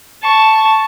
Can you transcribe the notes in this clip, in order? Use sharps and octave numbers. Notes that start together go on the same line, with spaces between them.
A5 C#6